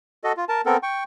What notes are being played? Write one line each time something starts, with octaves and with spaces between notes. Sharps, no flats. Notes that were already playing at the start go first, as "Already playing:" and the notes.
F#4 A4 D#5
F4
A#4 A5
B3 C4 A4 A#4
G5 C#6